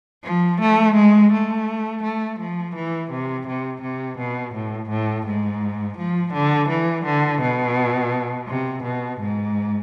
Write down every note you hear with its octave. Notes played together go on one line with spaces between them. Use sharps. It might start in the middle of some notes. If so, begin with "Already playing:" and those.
F3
A3
G#3
A3
A3
F3
E3
C3
C3
C3
B2
A2
A2
G#2
F3
D3
E3
D3
B2
C3
B2
G#2